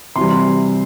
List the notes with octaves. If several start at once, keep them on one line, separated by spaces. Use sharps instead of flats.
C3 E3 G3 C6